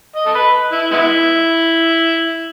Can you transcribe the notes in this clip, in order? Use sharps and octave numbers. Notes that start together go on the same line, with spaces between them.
D#5
A4
B4
E4
G#3 B3 E4